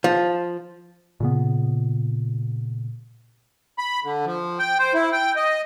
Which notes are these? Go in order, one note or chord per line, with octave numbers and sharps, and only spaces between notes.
F3
A#2 C#3 B3
B5
D3
F3
G5
C5
E4
G5
D#5